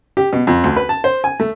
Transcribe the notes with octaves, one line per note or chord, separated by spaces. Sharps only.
G4
B2
F2
D2
B4
A5
C5
G#5
A3